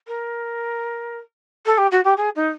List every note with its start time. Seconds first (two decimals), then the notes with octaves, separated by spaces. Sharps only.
0.07 A#4
1.65 A4
1.78 G4
1.91 F#4
2.04 G4
2.17 G#4
2.36 D#4